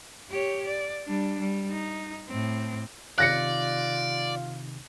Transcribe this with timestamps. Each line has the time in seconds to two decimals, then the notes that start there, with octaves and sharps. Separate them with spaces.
0.30 G4 C#5
0.66 D5
1.04 G3 D4
1.40 G3
1.71 D#4
2.28 A2 C4
3.18 C3 D#3 D#4 F4 D5 F#6 A#6 C#7